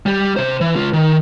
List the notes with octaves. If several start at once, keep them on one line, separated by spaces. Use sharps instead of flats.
G3 G4
C3 C5
E3
C#2 F4
D#3